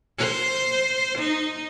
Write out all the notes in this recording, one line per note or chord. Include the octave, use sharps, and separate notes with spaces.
C5
D#4